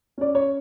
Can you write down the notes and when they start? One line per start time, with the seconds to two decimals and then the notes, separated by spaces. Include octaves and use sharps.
0.18 C#4 D5
0.35 C#5